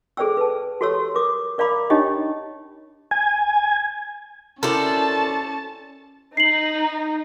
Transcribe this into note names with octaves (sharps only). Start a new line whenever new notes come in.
G#4 A4 C5 D5 G5 E6
B4 A5
F#4 G4 A4 C#5 C6 E6
A#4 D6 D#6
A#4 D5 F5 A#5 B5 D6
D4 D#4 G4 C#5 D#5 G5
G#5
C#4 E4 F#4 A4 A#4 C5 D5 A5
D#4 C7 F#7